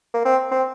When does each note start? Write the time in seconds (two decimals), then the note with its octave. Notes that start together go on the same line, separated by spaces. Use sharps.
0.14 A#3
0.25 C4
0.51 C4